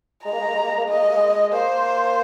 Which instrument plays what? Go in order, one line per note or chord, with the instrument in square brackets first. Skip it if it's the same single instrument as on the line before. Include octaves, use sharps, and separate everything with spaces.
[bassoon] G#3 [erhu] A#5
[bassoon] A#3
G#3
A#3
G#3
A#3
G#3
A#3
G#3
[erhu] D#5
[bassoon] A#3
G#3
A#3
G#3
[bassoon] A#3 [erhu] C5